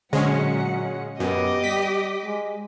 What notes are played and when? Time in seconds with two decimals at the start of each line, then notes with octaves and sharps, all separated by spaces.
0.13 A#2 D3 F#3 G#3 C#4 F#5
1.20 F#2 B3 G4 D#5 D6
1.64 G3 B6
2.25 G#3